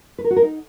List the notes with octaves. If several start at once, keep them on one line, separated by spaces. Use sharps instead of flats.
B4
A#4
F#4
A#4
D#4